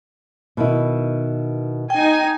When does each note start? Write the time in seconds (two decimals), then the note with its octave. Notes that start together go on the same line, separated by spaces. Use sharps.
0.57 B2 D#3 E4
1.90 D#4 G5 G#5